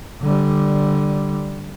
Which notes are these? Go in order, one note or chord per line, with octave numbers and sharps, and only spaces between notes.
D3 G3